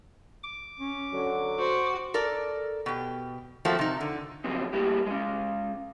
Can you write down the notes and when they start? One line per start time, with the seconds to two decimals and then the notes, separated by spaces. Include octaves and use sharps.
0.44 D6
0.80 C#4
1.11 D3 F#3
1.60 F#4 C5
2.14 A4 A#4 D5
2.86 B2 G4
3.65 F3 A3 A#3 C4 F#4
3.79 C3 D#4
4.01 D3
4.44 C#3 F3 F#3 B3 C4 D#4
4.73 G3 A3 A#3 E4 G4
5.06 G#3 C#4